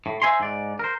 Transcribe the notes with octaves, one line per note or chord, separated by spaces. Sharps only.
A2
C5 E5 G#5 A#5 C6
G#2 D5
A#4 C5